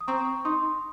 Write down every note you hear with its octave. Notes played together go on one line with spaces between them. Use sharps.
D#6
C4 A#5 C#6
D#4 C6 D#6